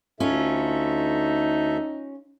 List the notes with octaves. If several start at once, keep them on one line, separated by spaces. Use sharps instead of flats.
D2 C#4 D#4 F4 A4 E5